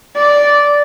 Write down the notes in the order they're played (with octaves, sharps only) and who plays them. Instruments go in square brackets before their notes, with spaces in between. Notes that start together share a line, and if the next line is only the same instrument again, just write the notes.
[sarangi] D5